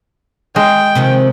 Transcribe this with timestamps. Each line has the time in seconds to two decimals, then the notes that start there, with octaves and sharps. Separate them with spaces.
0.56 G#3 G5
0.95 C3 D#3 F3